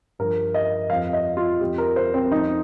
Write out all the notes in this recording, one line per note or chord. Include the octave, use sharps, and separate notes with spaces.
G2 F3 A#4
D#5
F2 F3 F5
D#5
F4
F2 F3 G4
A#4
C5
C4
F2 F3 D#4